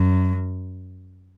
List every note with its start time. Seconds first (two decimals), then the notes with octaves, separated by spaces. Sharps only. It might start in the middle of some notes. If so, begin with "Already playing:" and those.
Already playing: F#2